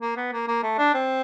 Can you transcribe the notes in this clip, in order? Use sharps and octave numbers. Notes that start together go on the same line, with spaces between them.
A#3
B3
A#3
A#3
A3
D4
C4